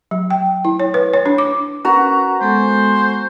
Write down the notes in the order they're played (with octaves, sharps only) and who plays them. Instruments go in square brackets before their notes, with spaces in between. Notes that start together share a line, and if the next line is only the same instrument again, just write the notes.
[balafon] F#3
G5
E4
C#5
B4
C#5
D4
D6
[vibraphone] C#4 A#4 B4 [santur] F#4 A#5
[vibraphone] G#3 B3 A4 [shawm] C5